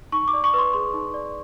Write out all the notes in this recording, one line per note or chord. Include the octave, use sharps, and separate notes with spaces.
D#4 C#6
D6
D5
C#6
B4 C6
G#4 C6
D#4
D5